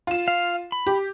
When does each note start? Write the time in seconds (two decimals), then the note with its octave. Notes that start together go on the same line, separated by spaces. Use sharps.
0.07 F4 E7
0.28 F5
0.72 B5
0.87 G4